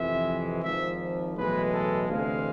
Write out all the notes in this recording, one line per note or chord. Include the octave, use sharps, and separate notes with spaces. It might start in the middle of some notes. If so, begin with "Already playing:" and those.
Already playing: F2 C3 E3 G#3 E5
G#1 G#2 F3 E5
B1 A2 E3 G#3 B4
A4
D2 C3 E3 G#3 F5